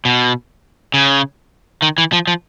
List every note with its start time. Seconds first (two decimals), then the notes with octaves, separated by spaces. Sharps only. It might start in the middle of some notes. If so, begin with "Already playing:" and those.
0.05 B2
0.94 C#3
1.82 D#3
1.98 E3
2.13 F3
2.27 F3